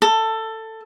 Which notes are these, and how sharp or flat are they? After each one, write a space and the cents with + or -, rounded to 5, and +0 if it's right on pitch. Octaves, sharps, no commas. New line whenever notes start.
A4 +15